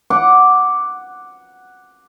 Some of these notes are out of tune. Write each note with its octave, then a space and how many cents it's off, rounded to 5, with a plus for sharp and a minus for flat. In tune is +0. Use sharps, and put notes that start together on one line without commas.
F#5 +0 D6 +0